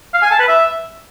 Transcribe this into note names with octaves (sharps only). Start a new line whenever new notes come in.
F5
G#5
A5
B4
E5